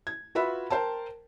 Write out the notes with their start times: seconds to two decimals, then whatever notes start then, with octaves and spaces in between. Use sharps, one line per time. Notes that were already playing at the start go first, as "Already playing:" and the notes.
0.07 G#6
0.35 F4 F#4 B4 E5 B5
0.70 A#4 C5 G5 A5